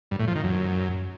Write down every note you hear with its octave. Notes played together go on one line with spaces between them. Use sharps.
G2
A2
F3
D#3
F#2